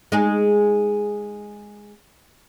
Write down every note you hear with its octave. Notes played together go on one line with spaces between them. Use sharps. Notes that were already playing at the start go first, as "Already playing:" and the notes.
G#3 D#4 G#4